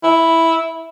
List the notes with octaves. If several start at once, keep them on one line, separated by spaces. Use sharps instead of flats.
E4